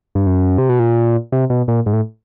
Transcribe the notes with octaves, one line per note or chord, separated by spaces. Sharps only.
G2
F#2
C3
B2
A#2
C3
B2
A#2
G#2
A2